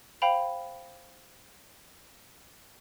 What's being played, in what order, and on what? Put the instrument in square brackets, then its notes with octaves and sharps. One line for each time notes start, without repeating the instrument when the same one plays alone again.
[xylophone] C5 F5 G5 B5 F7